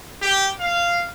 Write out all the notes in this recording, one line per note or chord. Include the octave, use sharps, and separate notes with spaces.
G4
F5